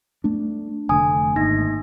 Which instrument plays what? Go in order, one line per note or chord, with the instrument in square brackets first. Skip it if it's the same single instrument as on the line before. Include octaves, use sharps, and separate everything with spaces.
[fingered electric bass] A3 D4
[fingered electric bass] F1 D3 A3 [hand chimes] G#5 D#6
[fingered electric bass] G#1 [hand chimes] A#3 D#4 A#6